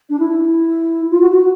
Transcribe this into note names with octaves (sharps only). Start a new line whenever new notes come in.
D4
E4
F4
F#4
F#4